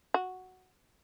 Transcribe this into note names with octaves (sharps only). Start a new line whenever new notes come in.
F#4